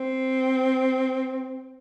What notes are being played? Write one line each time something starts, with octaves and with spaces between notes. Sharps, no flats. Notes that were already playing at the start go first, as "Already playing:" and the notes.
Already playing: C4